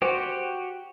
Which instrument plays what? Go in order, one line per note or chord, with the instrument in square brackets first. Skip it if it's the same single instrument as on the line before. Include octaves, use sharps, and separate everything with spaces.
[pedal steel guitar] F#4 G4 [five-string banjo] C5